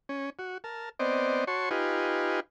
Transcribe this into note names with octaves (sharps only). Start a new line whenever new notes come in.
C#4
F#4
A#4 A5
B3 C4 C5 D5 D#5
F#4 C#5 A5 C6 C#6
D#4 F4 G4 B4 G#5